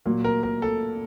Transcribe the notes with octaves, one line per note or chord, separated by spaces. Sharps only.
A#2 F#3 A#3
A#4
A#4
A4